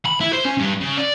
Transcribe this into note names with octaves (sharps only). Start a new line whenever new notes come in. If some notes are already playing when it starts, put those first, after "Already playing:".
B5
E4
C5
C#4
G2
C#3
D5